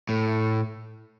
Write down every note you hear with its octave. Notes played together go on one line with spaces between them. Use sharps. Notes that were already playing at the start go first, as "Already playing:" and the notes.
A2 A4